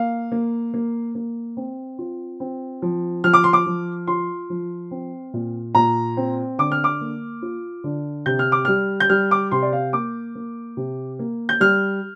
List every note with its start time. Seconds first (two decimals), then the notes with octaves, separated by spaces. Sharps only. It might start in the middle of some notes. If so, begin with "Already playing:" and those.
Already playing: A#3 F5
0.32 A#3
0.74 A#3
1.15 A#3
1.57 C4
1.99 F4
2.40 C4
2.82 F3
3.24 F3 F6
3.33 D6
3.44 C6
3.53 D6
3.66 F3
4.07 F4 C6
4.50 F3
4.91 C4
5.34 A#2
5.75 A#2 A#5
6.17 C4
6.58 D3 D6
6.72 F6
6.84 D6
7.01 A#3
7.42 F4
7.84 D3
8.26 C3 G6
8.39 F6
8.52 D6
8.65 G3 F6
9.00 G6
9.10 G3 F6
9.31 D6
9.51 C3 C6
9.62 D5
9.73 F5
9.93 A#3 D6
10.35 A#3
10.77 C3
11.19 A#3
11.49 G6
11.60 G3 F6